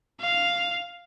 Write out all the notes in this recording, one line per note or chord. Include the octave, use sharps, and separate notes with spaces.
F5